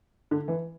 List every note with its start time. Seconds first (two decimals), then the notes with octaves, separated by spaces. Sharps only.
0.31 D3
0.48 E3